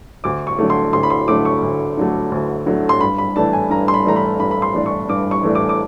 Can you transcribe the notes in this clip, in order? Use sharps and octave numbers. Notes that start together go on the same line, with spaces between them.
D2 D6
C#6
D3 F#3 A3
C6
D2 C6
B5
C6
D3 F#3 A3 D6
C#6
D2
D3 F#3 A3
D2
D3 F#3 A3
C6
G2 B5
B5
E3 A3 D4 A5
G#5
G2 A#5
C6
B5
E3 A3 D4 A#5
B5
G2 B5
B5
C6
E3 A3 D4
C#6
G2 D6
C#6
E3 A3 D4
D6
D6